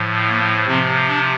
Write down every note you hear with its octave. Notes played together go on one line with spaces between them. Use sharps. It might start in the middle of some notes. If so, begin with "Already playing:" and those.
Already playing: A2 F3
A#3
C3 F3 C4
D4